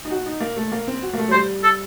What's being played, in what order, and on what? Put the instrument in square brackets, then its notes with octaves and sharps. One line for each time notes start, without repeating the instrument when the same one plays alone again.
[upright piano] D#4
F#4
D#4
A#3
A3
A#3
C4
F#4
A#3
A3
F#3
[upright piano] G3 [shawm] C5
[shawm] A4